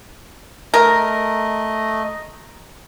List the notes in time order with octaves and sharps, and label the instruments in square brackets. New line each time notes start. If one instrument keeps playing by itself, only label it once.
[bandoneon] A3 D#5 [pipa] A#4